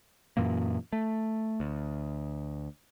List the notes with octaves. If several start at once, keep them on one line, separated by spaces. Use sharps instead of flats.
F#2 A#2 E3 A#3
A3
D2